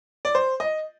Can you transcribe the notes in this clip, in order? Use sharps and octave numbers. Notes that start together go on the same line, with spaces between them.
D5
C5
D#5